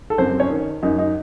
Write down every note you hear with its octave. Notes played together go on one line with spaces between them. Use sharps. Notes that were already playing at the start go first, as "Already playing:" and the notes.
A4
F#2 C4 C5
C#4 C#5
D#3
F#2 D#4
D#4